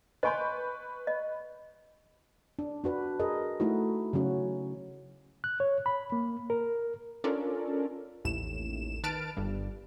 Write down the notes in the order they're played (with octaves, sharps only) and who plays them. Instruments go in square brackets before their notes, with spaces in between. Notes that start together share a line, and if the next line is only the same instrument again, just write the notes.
[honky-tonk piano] B4 C#6 G6 [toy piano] D#5 G#5 C6
[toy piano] D#5
[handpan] D4
D4 F#4 B4
G#4 A#4 D#5
A3 D#4 E4 F#4
C#3 F#3 C#4 F#4
[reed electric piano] F#6
C#5
B5
A#3
A#4
[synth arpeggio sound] C#4 D4 F4 A4 A#4 D5
A1 D#2 A2 E7
D#3 B4 A5 F6 A6 D7
G1 G2 G3